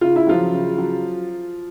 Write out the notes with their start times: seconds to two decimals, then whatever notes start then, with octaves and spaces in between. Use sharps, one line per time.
0.01 C#3 F4
0.16 E4
0.27 F3 F#3 F4
0.53 C#3
0.78 F#3